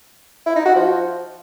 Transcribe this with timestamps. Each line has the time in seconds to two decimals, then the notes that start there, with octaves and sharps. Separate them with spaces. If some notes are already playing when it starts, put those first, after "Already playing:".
0.46 E4
0.56 D#4
0.66 F#4
0.75 F3